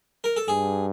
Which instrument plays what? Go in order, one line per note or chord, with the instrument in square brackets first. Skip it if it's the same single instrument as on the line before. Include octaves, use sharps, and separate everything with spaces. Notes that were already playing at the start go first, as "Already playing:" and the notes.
[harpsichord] A#4
A4
[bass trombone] G2 [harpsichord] G#4